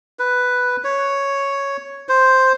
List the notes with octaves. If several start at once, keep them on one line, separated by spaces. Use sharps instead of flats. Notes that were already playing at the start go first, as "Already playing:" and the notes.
B4
C#5
C5